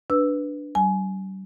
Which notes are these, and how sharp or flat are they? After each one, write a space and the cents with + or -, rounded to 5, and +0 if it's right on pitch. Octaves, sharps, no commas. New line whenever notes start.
D4 +0 B4 +0 E6 +0
G3 -40 G#5 +20